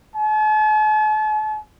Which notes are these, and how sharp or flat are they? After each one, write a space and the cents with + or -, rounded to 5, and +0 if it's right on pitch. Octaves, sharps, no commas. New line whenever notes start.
A5 -45